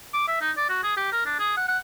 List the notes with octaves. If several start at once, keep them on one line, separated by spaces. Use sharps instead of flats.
D6
E5
D#4
D5
F#4
G#4
G4
A#4
D4
G#4
F#5
F#5